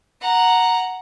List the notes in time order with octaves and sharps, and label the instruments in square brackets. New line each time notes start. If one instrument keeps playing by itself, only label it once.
[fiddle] F#5 A#5